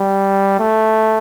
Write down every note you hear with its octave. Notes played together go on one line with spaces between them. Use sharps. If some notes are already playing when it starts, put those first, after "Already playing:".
Already playing: G3
A3